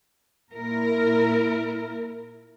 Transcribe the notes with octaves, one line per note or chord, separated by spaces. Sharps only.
A#2 E4 A#4